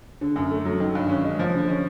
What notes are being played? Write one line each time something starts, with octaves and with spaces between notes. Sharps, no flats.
D3
F#2
A3
F#3
D#3
G2
C#4
G#3
F3
D3
C#4